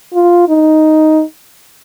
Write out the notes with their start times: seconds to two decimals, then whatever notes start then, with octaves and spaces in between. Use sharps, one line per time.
0.14 F4
0.49 D#4